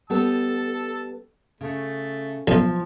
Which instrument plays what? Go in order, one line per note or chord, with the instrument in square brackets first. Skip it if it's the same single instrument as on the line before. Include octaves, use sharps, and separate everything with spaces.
[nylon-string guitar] G3 B3 A4 [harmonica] A5 E6
[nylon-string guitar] C#3 [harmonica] A3
[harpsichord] B1 [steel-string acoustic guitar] F3